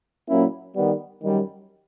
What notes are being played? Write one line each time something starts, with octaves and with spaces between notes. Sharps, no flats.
A#2 F#3 A#3 C#4 E4
D#3 G3 B3
F#2 D#3 G3